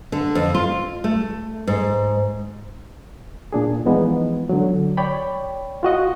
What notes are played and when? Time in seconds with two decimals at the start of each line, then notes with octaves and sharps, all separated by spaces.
0.12 D3
0.35 F2
0.54 F4
1.04 A3
1.67 G#2
3.53 A#2 D4 G#4
3.86 E3 F3 G#3 B3 D#4
4.49 D3 F#3
4.97 C#5 D5 G5 B5
5.83 F4 F#4 D#5 F#5